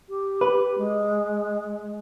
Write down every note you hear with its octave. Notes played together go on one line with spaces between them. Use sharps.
G4
B4
G#3